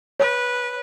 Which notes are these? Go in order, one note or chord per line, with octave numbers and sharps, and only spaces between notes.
B4 C#5